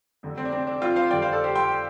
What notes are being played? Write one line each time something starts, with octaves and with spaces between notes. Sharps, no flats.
F1 F2 D3
C4
D4
C4
D4
C4 F4
C5 F5
F2 D3 G3 D5 G5
C5 F5
A4 D5
G4 C5
G5 C6